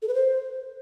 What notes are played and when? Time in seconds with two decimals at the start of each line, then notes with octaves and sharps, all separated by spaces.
0.02 A4
0.08 B4
0.14 C5